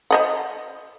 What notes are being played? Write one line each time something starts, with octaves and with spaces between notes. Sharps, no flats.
C5 D#5 F#5